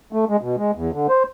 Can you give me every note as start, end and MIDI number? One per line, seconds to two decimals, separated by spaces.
0.12 0.25 57
0.28 0.37 56
0.41 0.56 47
0.57 0.71 56
0.75 0.91 40
0.92 1.07 50
1.09 1.23 72